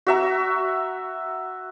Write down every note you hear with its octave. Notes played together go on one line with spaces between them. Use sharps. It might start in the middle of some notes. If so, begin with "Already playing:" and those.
F#4 E5 A#5